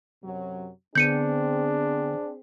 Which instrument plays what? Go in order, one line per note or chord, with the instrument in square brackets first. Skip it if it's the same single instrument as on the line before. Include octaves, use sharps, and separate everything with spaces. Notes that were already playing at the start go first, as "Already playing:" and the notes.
[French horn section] F#2 C3 F#3
[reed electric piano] D3 B3 [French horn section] C4 G#4 [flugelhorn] D4 [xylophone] G6 C#7 D#7